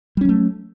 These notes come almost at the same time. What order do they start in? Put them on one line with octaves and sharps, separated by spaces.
G3 C#4 F#3 A3